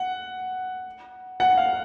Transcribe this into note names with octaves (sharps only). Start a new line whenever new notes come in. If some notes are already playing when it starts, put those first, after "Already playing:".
Already playing: F#5
F#5
F5